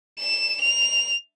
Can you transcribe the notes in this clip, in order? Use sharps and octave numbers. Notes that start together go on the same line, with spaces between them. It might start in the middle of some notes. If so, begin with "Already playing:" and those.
E7
F7